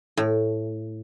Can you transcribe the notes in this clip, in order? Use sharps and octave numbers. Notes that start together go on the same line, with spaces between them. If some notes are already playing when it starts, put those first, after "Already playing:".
A2